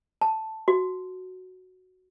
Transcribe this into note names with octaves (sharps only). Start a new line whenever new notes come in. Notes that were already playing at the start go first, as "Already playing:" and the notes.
A5
F#4